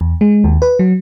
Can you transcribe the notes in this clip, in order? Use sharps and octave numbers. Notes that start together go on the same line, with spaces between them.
E2
G#3
D#2
B4
F#3